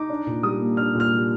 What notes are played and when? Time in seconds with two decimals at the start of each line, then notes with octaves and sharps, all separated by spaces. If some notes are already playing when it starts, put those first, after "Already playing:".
Already playing: D#4 D6
0.10 D4
0.27 A#2
0.43 G3 D#6
0.61 A#3
0.77 D4 F6
0.95 A#2
1.00 F6
1.12 G3